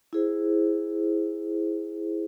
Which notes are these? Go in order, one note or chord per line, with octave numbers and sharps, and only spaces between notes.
E4 G#4 C5